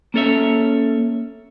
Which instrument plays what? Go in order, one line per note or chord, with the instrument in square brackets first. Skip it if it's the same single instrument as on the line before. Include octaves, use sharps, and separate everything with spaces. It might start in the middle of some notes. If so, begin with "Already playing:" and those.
[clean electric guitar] A#3 C#4 A4 C#5 E5